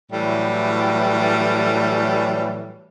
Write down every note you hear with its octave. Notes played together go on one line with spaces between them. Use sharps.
A2 E3 F#3 G3